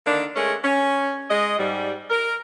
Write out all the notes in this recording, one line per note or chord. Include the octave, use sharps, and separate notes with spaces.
D3 D#3 A#3 D4
G#3 A3 C#4 G#4 A#4
C#4
G#3 D#5
G#2 G3
A#4